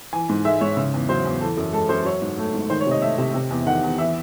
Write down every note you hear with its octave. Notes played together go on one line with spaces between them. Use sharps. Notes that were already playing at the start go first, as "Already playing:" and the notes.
E3 G#5
G#2
G#3 E5
G#2 C#5
C#3
E2
F#3 C5
E2
E3 A4
F#2
G#3 A4
F#2 C5
F#3 C#5
G#2
A3
G#2
D#3 C5
C#5
C3 D#5
A3 E5
C3
C3
E2
D#3 F#5
E2
E3 E5